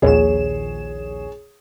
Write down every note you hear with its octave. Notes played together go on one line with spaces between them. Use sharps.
A#1 D#2 G#4 C#5 E7